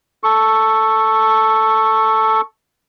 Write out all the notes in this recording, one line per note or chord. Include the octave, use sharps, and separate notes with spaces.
A4 C#6